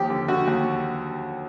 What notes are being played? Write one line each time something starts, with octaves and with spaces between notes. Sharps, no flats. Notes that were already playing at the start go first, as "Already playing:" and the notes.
Already playing: D#2 F3 G4
D3
D3 F#4
D#2